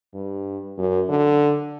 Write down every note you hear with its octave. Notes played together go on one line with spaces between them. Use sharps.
G2
F#2
D3